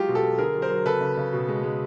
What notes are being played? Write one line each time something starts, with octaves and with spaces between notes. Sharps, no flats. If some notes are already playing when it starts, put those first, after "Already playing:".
Already playing: F#3 G#3 F4 G4
B2
G4 A4
F#3
D3 G#4 A#4
F#3
A#4 C5
F#3
C#3 A4 B4
C#3
C#3
B2
G#3
G#3